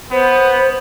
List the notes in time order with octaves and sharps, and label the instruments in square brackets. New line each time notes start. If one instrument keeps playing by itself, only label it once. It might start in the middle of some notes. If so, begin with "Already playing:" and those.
[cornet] B3 [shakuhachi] C5